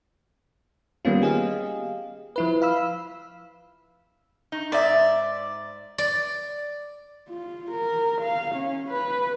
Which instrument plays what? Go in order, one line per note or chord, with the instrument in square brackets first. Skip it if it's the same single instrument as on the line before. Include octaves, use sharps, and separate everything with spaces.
[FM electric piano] D#3 G3 A#3 B3 C#4 F4
G4 G#4 D#5 F5
F3 E4 B4
F5 B5 E6
[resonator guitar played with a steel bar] D#4
[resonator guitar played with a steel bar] G#2 E5 [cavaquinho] D5
[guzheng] D5
[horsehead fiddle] F4
A#4
F5
C#4
B4